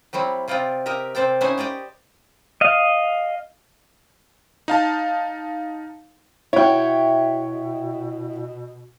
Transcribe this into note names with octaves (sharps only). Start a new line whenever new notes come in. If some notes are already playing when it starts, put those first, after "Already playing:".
F#3 G3 C4 E4
C3 C4 F4 D5 D#5 G5
G4 A#4 D#5 E5
C3 C4 C5 D5 G5
C#4 D#4 E4 C5 F#5 G#5
G4 D5 D#5 G5
D#5 F5
D#4 F5 A5
B2 E4 F#4 C#5 G5